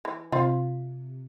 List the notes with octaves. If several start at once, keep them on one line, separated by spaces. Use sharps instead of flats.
E3
C3 F4 C5 F5